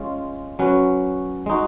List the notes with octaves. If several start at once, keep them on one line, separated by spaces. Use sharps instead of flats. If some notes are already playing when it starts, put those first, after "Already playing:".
Already playing: G#3 C#4 F4
F#3 C#4 F#4 B4
G#3 D#4 F#4